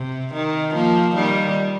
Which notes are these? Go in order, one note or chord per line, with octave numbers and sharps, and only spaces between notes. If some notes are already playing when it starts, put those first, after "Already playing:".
Already playing: C3
D#3
F3 A#3
D#3 G3